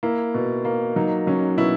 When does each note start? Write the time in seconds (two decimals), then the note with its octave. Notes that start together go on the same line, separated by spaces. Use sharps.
0.03 A#3 E4
0.34 B2
0.65 A#3
0.96 F#3 D#4
1.27 F#3 C#4
1.57 B2 E4